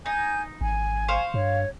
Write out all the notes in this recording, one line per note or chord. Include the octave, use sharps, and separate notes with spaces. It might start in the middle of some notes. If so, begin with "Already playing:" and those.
D#4 G#5 G6
G#1 G#5
C5 F5 C#6
G2 C#5